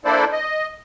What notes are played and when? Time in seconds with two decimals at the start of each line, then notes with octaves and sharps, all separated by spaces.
0.05 A#3 D4 E4 A4 C5 D5
0.33 D#5